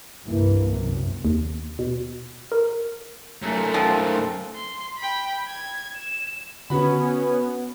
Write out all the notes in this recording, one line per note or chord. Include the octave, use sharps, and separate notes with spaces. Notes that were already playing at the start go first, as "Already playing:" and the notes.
C2 G2 E3 A#3
F#2 C3
D#2
B2
A#4
F#2 A3
F3 C4
C6
G5 B5
G#6
E7
D3 B3 C#4 F#4 B5